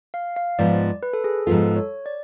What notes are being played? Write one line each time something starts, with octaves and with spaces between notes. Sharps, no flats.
F5
F5
G#2 F3 B3 F4 D5
B4
A4
G#4
G#2 F3 B3 F4 A4
C#5
D5